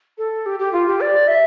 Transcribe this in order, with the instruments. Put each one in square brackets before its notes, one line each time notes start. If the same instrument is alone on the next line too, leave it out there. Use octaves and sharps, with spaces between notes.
[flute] A4
G4
G4
F4
G4
D5
E5